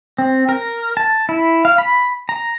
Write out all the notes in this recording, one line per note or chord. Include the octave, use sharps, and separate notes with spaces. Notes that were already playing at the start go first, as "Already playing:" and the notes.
C4
A#4
A5
E4
F5
B5
A#5